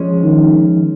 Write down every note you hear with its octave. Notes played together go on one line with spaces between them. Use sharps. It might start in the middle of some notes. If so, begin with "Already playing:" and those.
Already playing: F3 G#3 C#4
D#3